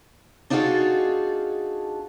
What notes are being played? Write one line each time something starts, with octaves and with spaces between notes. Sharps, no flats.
D4 D#4 F4 F#4 G#4 A4